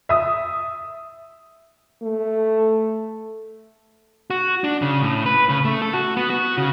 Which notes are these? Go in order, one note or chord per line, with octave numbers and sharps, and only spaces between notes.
E5 D#6
A3
F#4
D4
C#3
A2
B4
C#3
A3
A4
F#4
B3
F#4
C#3